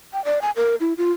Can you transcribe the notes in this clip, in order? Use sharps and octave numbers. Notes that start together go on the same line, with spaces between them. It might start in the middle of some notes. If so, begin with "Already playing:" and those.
G5
D5
G#5
A#4
E4
F4